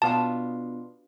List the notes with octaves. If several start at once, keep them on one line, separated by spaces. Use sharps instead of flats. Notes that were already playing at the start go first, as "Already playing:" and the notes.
B2 B3 D4 F4 A5